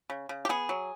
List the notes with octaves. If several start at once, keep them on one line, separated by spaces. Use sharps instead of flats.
C#3
C#3
G4
B3 G#4
F#3